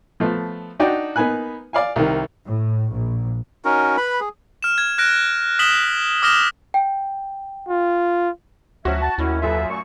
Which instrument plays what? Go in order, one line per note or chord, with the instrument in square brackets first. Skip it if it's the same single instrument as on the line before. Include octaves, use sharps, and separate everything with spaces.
[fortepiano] F3 A3 B3
D4 D#4 F#4 D5 G5
A#3 B3 D#4 B4 G#5 F#6
D5 F5 G#5
C2 D#3
[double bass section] A2
A#1
[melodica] C#4 D#4 F#4 A#4
B4 B5
G#4
[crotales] F6 E7
G#6
F6 F#6 A#6 D7
D#6 B6 E7 F#7 G7
D6 D#6 F6 A#6 E7 G7
[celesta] G5
[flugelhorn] F4
[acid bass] D2 [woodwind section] F3 F#3 C#4 [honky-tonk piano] F#4 [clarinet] E5
[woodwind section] A5
[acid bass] D#2 [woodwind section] D#3 A3 C#4 [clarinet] E4
[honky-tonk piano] F#2 F#3 F4 [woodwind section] A4 B4 [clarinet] E5
[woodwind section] A#2 A3 C#6